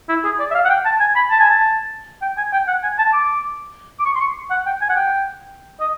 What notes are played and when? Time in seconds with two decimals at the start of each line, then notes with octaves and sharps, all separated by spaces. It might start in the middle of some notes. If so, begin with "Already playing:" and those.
0.09 E4
0.25 G#4
0.40 D5
0.51 E5
0.55 F5
0.65 F#5
0.70 G5
0.85 A5
1.00 G#5
1.16 B5
1.31 A5
1.40 G#5
1.50 A5
2.22 G5
2.38 G#5
2.53 G5
2.68 F#5
2.83 G#5
2.99 A5
3.13 D6
4.00 D6
4.05 C#6
4.16 C6
4.20 C#6
4.51 F#5
4.66 G5
4.81 G#5
4.90 F#5
4.96 G5
5.80 D#5